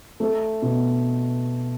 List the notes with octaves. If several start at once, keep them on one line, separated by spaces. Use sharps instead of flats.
A3
B2